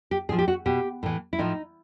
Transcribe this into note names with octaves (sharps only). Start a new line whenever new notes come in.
G4
A2 F3 G#4
G4
F#4
B2 G4
A2 E3
E4
A2 F3 D#4